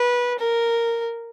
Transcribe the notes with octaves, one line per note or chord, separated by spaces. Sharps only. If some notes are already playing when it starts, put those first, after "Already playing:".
Already playing: B4
A#4